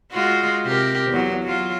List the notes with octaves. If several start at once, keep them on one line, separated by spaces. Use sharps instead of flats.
G#3 F4 F#4
C3 G4 A#4
E2 F#3
F#3 F4